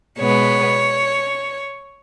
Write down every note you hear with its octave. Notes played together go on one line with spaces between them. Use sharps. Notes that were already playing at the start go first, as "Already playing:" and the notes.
B2 G#3 B3 C#5